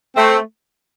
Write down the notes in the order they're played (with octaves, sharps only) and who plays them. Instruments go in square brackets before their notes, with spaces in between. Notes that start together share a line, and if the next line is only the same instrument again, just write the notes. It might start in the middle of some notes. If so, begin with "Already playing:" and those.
[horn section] A3 C4